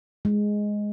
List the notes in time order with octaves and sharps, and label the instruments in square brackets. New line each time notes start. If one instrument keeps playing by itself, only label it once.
[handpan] G#3